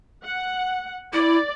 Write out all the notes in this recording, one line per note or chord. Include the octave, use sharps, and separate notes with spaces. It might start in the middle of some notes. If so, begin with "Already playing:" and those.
F#5
E4 D5